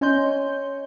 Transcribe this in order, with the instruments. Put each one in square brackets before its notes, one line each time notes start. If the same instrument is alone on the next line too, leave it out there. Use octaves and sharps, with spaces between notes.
[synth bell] C#4 C#5 D#5 C6 G6 G7